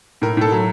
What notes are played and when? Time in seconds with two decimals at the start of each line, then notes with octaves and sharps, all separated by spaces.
0.22 A2 A#4
0.37 A2 A4
0.52 F#3